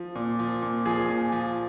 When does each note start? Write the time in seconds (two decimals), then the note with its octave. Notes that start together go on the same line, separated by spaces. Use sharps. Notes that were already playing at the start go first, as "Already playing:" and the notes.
Already playing: F3
0.15 A#2
0.39 F3
0.62 A#2
0.86 F3 G#4
1.09 A#2
1.32 F3